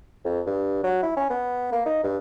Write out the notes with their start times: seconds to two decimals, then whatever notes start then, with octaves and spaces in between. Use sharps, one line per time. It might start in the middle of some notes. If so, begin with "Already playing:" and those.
0.25 F2
0.46 G2
0.84 F#3
1.03 E4
1.17 C#4
1.30 B3
1.72 A#3
1.86 D#4
2.04 G2